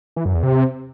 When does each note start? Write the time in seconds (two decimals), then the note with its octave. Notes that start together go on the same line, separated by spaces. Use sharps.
0.16 E3
0.25 F#2
0.34 E2
0.43 C3